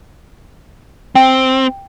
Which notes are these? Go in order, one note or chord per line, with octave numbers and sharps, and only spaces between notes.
C4 G5